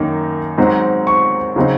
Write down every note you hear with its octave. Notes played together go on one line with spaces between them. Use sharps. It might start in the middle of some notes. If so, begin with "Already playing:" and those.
Already playing: F#2 D#3 A#3 D#4
G#2 F#3 C4 D#4
C#6
C#3 F#3 C4 D#4